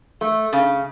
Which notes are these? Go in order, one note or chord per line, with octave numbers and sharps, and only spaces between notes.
A3
C#3